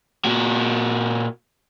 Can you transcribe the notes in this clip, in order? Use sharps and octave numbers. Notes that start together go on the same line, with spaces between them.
A#2 F#4